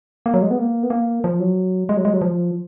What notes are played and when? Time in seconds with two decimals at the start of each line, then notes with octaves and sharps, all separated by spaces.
0.26 A#3
0.34 F#3
0.42 G#3
0.51 B3
0.58 A#3
0.83 B3
0.90 A#3
1.24 F3
1.40 F#3
1.89 G#3
1.97 F#3
2.05 G#3
2.13 F#3
2.22 F3